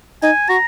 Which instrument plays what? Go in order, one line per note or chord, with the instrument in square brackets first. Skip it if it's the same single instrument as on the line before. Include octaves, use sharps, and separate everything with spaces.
[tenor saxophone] D#4 [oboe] G#5
[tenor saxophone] F#4 [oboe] A#5